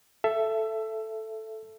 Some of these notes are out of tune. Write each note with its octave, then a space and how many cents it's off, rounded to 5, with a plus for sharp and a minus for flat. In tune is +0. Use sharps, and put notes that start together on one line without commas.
A4 +0 E5 +20